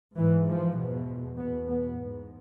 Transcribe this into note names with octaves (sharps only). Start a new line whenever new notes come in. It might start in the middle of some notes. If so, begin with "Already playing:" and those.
G#2 E3
F3
E2 B2
E2 B2 B3
B3
G#2